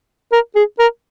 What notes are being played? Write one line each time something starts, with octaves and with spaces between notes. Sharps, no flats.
A#4
G#4
A#4